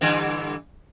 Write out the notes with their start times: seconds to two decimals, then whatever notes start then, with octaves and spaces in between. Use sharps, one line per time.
0.01 G2 D3 E3